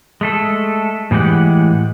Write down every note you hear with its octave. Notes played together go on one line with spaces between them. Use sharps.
G#3 A3 A4
A2 E3 G#3 G4 F#5